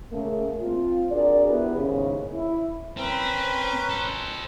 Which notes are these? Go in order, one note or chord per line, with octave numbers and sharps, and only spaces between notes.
C#3 A3 A#3
C4 F4
D4 F#4 G#4 A#4 D5
B3 E4 G4 G#4 B4
D#2 G#2 C#3
E4
C4 C#4 A#4 B4
A4 C5